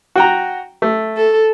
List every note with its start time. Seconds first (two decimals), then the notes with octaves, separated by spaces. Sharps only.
0.16 F#4 G5 A#5
0.82 A3
1.17 A4